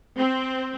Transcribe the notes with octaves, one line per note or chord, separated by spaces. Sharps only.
C4